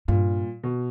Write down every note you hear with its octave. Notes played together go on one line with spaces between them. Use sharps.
G2 A#2
B2